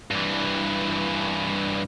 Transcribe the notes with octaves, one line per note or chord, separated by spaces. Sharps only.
G2 E3